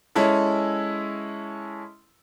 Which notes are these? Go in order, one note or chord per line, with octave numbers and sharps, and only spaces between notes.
G#3 C#4 E4 A4